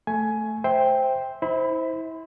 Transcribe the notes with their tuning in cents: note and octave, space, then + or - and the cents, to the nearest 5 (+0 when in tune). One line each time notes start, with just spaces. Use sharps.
A3 +0 G#5 +15
C5 +0 E5 -10 G5 +5
E4 -30 C5 +0 B5 +20